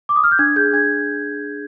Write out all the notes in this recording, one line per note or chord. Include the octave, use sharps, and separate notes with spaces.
D6
D#6
F6
G6
D4 G#6
G#4 G6
D4 G#6